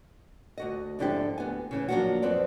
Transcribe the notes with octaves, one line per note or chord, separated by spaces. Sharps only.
D2 F#4 D#5
F2 G#2 D3 D4 E4 G4
D2 B3 G#5
C#3 E3 C#4
F3 F#3 G#3 A#3 D4 F#4
F2 C4 B4 D5